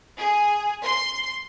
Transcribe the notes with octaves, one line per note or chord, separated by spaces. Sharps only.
G#4
C6